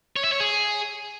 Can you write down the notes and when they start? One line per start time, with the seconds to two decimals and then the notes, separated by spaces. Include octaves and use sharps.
0.16 C#5
0.24 E5
0.32 C#5
0.40 G#4